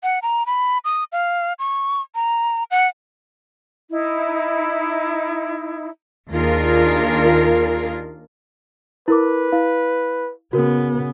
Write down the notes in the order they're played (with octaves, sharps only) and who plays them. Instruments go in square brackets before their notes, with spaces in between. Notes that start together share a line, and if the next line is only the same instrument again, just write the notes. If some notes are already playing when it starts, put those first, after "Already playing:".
[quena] F#5
A#5
B5
D#6
F5
C#6
A#5
F#5
[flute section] D#4 E4
[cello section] D#2 D4 F4 G#4 A#4
[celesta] E4 A#4 D6 [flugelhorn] B4
[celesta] E4 F5
[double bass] C#3 B3 [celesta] F#4 A#4